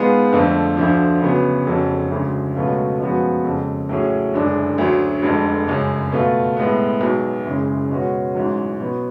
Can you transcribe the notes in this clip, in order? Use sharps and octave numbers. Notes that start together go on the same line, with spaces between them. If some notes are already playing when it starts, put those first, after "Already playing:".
Already playing: G#2 G#3 B3 F4 G#4
F2 D3 F3 A3
D2 D3 F3
D2 C#3 F#3 B3
F1 F2 C#3 F#3
D2 C#3 G#3
C#2 B2 F#3 A3 F4
F#2 F3 G#3 B3 F#4
F2 C#3 G#3
A2 F#3 C#4 G#4
F#1 F#2 D3 G#3 D4
D2 D3 F#3
F1 F2 D3 G#3
F#2 C#3 G#3
B2 A3 F4
A2 G#3 B3
B1 B2 G#3
F#1 F#2 C#3 G#3
B2 G#3 C#4 F#4
A1 G#2 F#3
B2 F#3 B3